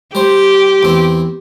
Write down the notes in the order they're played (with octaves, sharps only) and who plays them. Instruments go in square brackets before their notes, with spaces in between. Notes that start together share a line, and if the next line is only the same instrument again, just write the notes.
[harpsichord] G3 C5 [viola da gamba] G4
[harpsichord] E2 C4